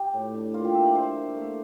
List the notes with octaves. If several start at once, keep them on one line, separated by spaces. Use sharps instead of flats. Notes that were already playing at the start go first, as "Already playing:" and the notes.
Already playing: G4
A2
D4
A#3 F4
G4
A#3 E5
D5
D4 C5
A#3
A3